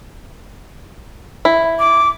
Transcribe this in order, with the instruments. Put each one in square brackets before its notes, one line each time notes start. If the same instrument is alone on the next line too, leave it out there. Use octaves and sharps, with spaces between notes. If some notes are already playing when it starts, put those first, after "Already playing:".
[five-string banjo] E4
[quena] D6